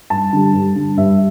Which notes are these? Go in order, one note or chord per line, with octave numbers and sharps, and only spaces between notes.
G2 A5
D3 G3
G2
D3 G3
G2 E5